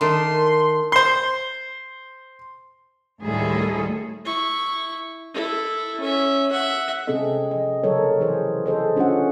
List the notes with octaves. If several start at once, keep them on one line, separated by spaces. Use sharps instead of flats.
D#3 A3 D4 C6
C5 C6
D2 A2 D#3 G3 G#4 A4
E4 C#6
E4 A4
C#4 E5
E5 F#5
C3 C4 C#4 G#4 A4 D#5
F3 D#5
C#3 F#3 A4 A#4 C#5
E3 G#4 C5
G#4 A4 C5 D#5
C#4 D4 F4 A4 F#5